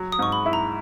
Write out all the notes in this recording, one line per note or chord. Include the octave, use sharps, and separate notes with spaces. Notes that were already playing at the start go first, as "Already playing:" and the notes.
Already playing: F#3
D#6
G#2 C#6
B5
E4
A#5